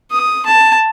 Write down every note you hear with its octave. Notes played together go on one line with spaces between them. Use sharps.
D#6
A5